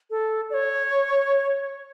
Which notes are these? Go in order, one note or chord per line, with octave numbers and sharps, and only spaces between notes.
A4
D5
C#5